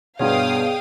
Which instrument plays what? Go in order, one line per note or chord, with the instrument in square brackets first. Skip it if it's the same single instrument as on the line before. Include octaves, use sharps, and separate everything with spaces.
[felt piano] G2 B2 [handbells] B3 C#5 [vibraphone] G#4 [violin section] F5 G5 D#6